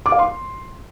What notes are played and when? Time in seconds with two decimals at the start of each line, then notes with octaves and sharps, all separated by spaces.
0.06 D6
0.12 F5
0.19 C6